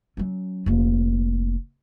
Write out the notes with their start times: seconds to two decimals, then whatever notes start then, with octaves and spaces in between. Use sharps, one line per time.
0.17 F#3 C#4
0.66 F1 A#3